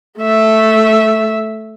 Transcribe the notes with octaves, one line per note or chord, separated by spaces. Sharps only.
A3 E5